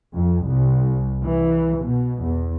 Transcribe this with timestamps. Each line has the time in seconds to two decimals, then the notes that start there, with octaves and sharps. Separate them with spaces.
0.16 F2
0.47 C2
1.24 E3
1.82 B2
2.24 E2